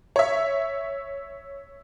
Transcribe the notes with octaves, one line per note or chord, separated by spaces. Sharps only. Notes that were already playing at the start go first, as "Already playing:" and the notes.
C#5 E5